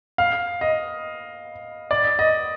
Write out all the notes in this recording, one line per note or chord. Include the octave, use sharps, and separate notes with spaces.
F5
D#5
D5
D#5